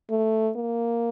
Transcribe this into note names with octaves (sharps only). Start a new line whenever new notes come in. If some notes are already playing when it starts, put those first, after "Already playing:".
A3
A#3